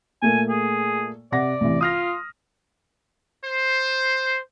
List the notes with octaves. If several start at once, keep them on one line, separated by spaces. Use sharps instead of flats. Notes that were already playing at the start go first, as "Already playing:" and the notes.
A#2 A3 A#3 G#5
G#4
C3 D5 F#5 A#6
A1 C3 E3
F4 D#6 F6 A#6
C5